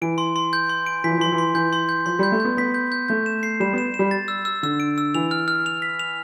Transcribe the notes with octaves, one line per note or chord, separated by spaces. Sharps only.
E3 D7
C6
C6
G6
C6
D7
E3 B6
F3
E3
F3 C6
E3
C6
E3 G6
C6
G6
F3 C6
G3 G6
A3
B3 G6
B3 B6
G6
G6
A3 G6
E7
C7
G3 E7
B3 E7
E7
G3
A6
E6
E6
D3 E6
D7
E6
E3 F7
F6
F6
F7
B6
F7